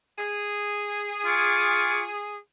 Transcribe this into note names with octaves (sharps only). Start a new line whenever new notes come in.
G#4
F4 G#5 C#6 D6